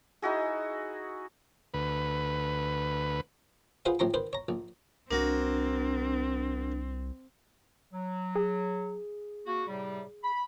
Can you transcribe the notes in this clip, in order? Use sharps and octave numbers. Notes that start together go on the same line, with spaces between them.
D#4 E4 F#4 G#4
D2 B4
F4 G#4 B4 C5 F5 F#5
A1 F3 C4 A#5 C#6
D#3 B4 C5
C#5 A#5
A#1
C2 A#3 C4 D4 F#4
F#3
G#4
A#3 F#4
A2 C3 G3
B5